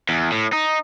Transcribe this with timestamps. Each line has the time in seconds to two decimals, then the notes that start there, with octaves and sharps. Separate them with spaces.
0.09 E2
0.32 A2
0.53 D#4